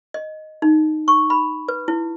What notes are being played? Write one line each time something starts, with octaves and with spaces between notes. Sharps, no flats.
D#5
D#4
C#6
B5
B4
E4